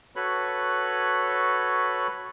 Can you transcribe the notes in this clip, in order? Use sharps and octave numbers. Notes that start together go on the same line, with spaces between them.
F#4 A4 B4 C#5 B5